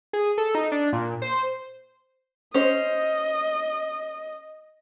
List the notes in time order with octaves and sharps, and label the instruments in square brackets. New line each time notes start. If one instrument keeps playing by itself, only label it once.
[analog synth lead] G#4
A4
D#4
D4
A#2
C5
[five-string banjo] C#4 C5 [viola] D#5